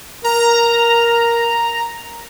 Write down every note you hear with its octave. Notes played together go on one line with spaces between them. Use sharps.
A#4 A#5